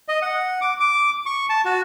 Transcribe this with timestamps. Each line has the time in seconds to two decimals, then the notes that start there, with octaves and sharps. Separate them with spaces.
0.08 D#5
0.22 F#5
0.61 D6
0.80 D6
1.26 C#6
1.49 A5
1.65 F#4